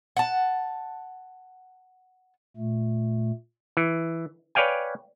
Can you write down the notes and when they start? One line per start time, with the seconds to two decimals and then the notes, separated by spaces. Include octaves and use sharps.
0.17 F#5 A5
2.57 A#2 A3
3.77 E3
4.55 B4 C#5 D5 F5 G5 G#5